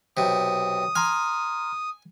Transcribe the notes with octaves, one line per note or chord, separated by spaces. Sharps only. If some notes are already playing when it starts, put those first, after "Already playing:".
B1 C3 D#6
G#5 A#5 C6 F6